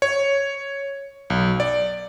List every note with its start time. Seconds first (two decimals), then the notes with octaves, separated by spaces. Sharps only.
0.02 C#5
1.30 B1
1.60 D5